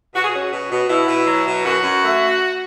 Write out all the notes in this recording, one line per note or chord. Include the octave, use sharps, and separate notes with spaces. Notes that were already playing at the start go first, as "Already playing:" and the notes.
B2 F#4
G#4
C#4 F#4
B2
B2
B2 E4
B2
F#3
B2
F#2 F#4
F#2
A3